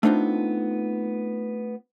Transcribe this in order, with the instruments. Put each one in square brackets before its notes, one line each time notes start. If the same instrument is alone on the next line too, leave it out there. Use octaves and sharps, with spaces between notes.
[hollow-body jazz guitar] A3 B3 C4 D4 D#4 F4